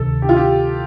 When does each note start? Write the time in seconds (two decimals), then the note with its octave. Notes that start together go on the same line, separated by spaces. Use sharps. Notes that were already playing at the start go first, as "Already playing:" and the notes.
Already playing: D2 C3 D#3 A4
0.22 G4
0.29 F4
0.36 G4